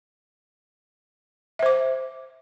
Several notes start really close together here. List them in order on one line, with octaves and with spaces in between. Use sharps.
E5 C5 D6